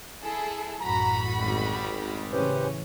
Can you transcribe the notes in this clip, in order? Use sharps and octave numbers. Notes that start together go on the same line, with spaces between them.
E4 G#4 A4
A1 F#2 A2 F#4 A#5 B5
G#1 G3 G#3
A2 C#3 E3 C#4 G4 B4 C5